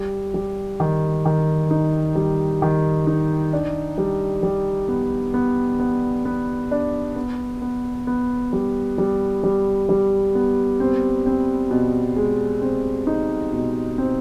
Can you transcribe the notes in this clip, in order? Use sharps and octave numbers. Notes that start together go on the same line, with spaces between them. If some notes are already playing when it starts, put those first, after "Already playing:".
Already playing: G3
G3
D#3
D#3
D#4
G3
D#3
D#4
D4
G3
G3
B3
B3
B3
B3
D4
B3
B3
B3
G3
G3
G3
G3
B3
C4
C4
B2
G#3
C4
D#4
B2
C4